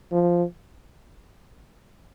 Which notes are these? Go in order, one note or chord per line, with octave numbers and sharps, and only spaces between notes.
F3